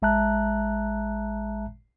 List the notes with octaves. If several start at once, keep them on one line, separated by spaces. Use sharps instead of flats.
A1 G#3 E5 A5 A#5 F#6